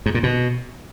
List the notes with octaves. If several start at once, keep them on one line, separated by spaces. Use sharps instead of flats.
G#2
A#2
B2